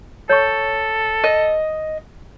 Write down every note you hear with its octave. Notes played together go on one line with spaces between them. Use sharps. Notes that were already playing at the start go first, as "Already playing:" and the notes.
A4 C#5 C#6
D#5